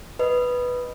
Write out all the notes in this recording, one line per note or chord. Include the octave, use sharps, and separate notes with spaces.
B4 D#5